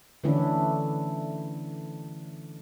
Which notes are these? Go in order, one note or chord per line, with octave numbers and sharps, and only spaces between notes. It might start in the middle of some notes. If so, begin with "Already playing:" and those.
D3 E3 A3 C#4 D4 E4